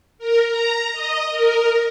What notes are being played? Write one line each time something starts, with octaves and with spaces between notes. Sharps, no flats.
A#4
A#5
D#5
A#4